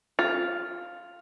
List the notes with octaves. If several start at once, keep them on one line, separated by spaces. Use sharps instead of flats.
F4